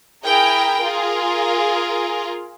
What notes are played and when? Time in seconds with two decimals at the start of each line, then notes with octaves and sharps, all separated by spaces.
0.25 E4 G#4 A#4 G5
0.83 F4 G#4 A#4